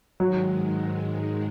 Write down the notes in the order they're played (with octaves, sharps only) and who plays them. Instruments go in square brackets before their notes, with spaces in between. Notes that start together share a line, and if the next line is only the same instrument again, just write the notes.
[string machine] G#2 D#3 G#3 [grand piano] F#3